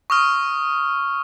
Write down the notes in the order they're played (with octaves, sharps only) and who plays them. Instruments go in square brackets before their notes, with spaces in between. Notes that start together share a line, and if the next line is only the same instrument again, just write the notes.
[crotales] C#6 D#6 F6